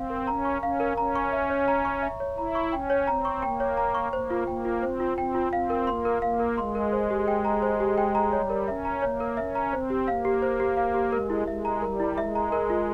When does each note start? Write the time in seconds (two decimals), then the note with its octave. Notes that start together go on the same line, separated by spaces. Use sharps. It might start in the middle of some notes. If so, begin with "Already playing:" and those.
Already playing: C4 F5
0.10 A#4
0.27 C#4 A#5
0.45 C#6
0.62 C#4 F5
0.80 A#4
0.97 C#4 A#5
1.15 C#6
1.33 E5
1.50 C#5
1.68 A#5
1.85 C#6
2.02 E5
2.20 C#5
2.38 E4 A#5
2.55 C#6
2.72 C#4 G5
2.90 C#5
3.07 C4 A#5
3.25 C#6
3.42 A#3 G5
3.60 C#5
3.77 A#5
3.95 C#6
4.12 A#3 C5
4.30 F4
4.47 A#3 G5
4.65 F4
4.82 C4 C5
5.00 F4
5.18 C4 G5
5.35 F4
5.53 C4 F5
5.70 A#4
5.87 A#3 C6
6.05 A#4
6.22 A#3 F5
6.39 A#4
6.58 G#3 C6
6.75 A#4
6.93 C5
7.10 G4
7.28 G5
7.45 A#5
7.62 C5
7.80 G4
7.98 G5
8.15 A#5
8.32 G3 C#5
8.50 A#4
8.68 C#4 E5
8.85 A#5
9.02 A#3 C#5
9.20 A#4
9.37 C#4 E5
9.55 A#5
9.72 C4 C5
9.90 G4
10.07 A#3 F5
10.25 G4
10.42 C5
10.60 G4
10.77 F5
10.94 G4
11.12 G#3 A#4
11.30 E4
11.47 G#3 E5
11.65 A#5
11.82 G3 A#4
12.00 E4
12.17 G#3 E5
12.35 A#5
12.52 A#4
12.70 F4